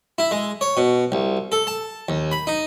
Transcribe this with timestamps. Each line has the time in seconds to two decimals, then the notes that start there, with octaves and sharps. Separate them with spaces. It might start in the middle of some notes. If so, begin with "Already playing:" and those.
0.18 E4
0.31 G#3
0.61 C#5
0.77 B2
1.12 C2
1.52 A4
1.67 A5
2.09 D#2
2.32 B5
2.47 D#4